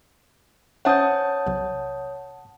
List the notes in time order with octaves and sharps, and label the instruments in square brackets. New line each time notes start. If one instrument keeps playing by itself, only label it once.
[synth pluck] C#4 C5 E5 [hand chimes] C#5 D#6 G6 [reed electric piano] F#5 A5
[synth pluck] B1 C3